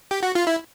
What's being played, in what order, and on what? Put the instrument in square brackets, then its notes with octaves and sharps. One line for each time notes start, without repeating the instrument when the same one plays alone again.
[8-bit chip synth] G4
F#4
F4
E4